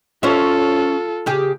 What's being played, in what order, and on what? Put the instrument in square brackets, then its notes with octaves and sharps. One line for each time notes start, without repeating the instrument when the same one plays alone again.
[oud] C#4 C5 E5 [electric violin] F4 A4
[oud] C#3 G4 G#4